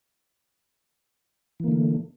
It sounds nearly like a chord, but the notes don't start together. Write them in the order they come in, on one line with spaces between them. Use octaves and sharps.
E3 A#3 D3 A3